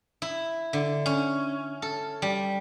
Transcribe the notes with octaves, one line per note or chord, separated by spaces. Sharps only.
E4
D3
C#4
A4
G3